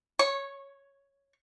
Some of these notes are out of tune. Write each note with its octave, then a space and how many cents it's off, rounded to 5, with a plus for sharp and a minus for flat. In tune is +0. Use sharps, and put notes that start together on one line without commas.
C#5 +0 C#6 -20